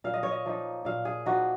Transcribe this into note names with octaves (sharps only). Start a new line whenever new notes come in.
A#2 F5
D#5
C#5
D#5
F3 A#3 D#4
A#2 F5
G#4
F3 A#3 D#4 F#4